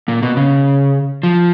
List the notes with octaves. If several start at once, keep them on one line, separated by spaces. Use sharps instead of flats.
A#2
B2
C#3
F3